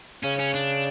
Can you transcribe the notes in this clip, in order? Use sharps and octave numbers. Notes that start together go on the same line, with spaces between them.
C#3 C#4
C#4
D4